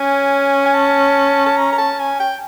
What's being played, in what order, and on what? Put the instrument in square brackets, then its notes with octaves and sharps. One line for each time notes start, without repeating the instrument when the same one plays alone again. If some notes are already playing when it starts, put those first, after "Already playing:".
Already playing: [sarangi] C#4 [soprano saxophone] G#5
[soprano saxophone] G#5
A5
A5
A#5
A#5
A5
G#5
G5